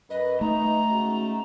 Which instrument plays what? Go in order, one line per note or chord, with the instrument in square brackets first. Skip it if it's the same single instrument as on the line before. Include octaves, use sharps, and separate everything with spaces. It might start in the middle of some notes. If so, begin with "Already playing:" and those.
[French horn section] F#2 B4 [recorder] D#5
[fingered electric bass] A3 [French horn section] D#4 [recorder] A#5
[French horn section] G#2 C#3 F#4